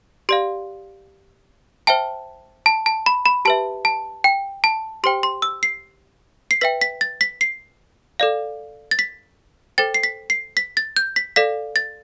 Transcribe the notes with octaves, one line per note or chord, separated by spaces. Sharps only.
G4 D5 F5 C6
C5 E5 G5 A5
A5
A5
B5
B5
G4 B4 E5 A5
A5
G5
A5
G4 C5 G5 C6
C6
E6
C7
C7
B4 E5 G5 B6
B6
A6
B6
C7
A4 D5 F5
A6
B6
A4 C5 G5 A6
C7
B6
C7
B6
A6
G6
B6
A4 D5 F5 B6
A6